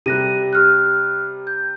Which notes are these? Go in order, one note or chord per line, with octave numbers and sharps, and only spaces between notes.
C3 G3 F#6 A#6 D#7
G4 F6 F#6
G6